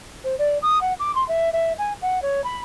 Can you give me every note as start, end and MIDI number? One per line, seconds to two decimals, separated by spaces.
0.24 0.35 72
0.38 0.58 74
0.62 0.81 87
0.81 0.93 78
0.99 1.14 86
1.15 1.26 84
1.28 1.52 76
1.52 1.73 76
1.78 1.93 80
2.02 2.22 78
2.22 2.44 73
2.44 2.61 83